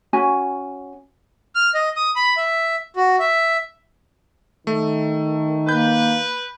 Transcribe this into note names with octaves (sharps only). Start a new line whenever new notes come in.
C#4 F#4 G#5
F6
D#5
D#6
B5
E5
F#4
E5
D#3 A3
A#3 B4 G6